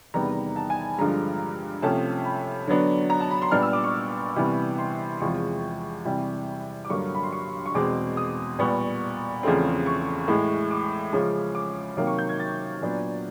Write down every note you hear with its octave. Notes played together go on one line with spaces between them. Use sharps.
E2 C3 D#3 G3 B3 A#5
A5
G#5
G2 D3 F3 G#3 A#5
C3 F3 A3 C#4 A5
B5
D3 F#3 B3 D4
A#5
A5
B5
C6
A#2 G3 B3 D4 F6
E6
D6
C#6
C3 E3 G3 B3
C6
E2 C3 F3 G#3 C#6
C3 E3 G3
D6
G2 D3 F#3 A#3 C#6
B5
C6
C#6
C#6
E2 B2 G#3 C4 D6
D#6
A#2 G3 B3 C#6
E2 C#3 F3 A3 C4
C#6
A2 E3 G#3
D6
C#3 F3 G#3 C#4
D6
C3 D#3 F#3 A#3 D6
C#6
G6
G#6
A6
A#2 F#3 B3 D4